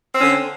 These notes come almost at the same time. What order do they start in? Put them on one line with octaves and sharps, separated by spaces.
C4 C#4 D3